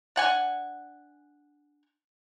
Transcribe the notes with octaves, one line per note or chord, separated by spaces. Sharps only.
D4 F#5 G#5